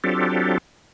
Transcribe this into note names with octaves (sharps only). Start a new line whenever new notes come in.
F#3 C4 D4 F4 G4 A4